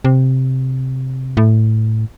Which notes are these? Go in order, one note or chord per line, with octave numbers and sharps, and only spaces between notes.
C3
A2